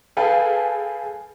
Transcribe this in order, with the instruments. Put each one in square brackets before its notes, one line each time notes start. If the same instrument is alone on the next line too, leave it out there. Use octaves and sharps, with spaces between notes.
[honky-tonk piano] G#4 A4 B4 F5 G5 G#5